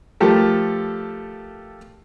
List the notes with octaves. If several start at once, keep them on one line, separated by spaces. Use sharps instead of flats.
F3 A3 G4 A4 A#4